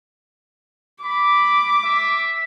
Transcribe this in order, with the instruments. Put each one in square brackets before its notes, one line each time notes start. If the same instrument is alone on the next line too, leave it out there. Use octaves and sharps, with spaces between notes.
[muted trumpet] B5 [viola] D6
[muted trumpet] E5